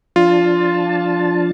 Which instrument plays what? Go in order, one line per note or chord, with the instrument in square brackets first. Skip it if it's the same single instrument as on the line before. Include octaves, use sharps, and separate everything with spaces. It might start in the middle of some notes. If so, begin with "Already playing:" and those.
[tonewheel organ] F3 D4 A5 [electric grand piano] F4